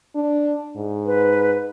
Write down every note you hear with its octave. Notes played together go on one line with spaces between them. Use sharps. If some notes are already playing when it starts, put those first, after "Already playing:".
D4
G#2
B4